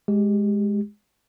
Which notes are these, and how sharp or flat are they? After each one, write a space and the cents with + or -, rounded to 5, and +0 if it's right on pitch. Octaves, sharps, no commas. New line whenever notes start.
G#3 +0 G4 +0